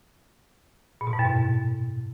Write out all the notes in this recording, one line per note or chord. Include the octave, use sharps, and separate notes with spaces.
A#2
B2
G#2
F#2
B2